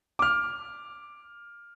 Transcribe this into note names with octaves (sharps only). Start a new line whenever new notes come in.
D6 F6